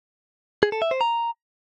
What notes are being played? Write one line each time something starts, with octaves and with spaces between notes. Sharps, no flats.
G#4
A4
E5
C5
A#5